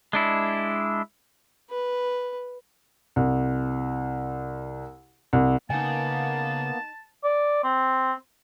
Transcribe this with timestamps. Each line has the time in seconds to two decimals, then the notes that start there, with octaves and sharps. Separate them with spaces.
0.13 G#3 D4 E4
1.70 B4
3.16 C2
5.33 C2
5.70 C#3 A#3 B3 D#4 G#5 A5
7.24 D5
7.64 C4